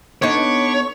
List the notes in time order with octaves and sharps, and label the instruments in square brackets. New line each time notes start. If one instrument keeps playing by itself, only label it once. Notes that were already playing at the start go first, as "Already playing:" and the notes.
[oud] B3 D4 D#4 [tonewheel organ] A4 B5 D6 [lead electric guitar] C#5 [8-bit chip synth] C#6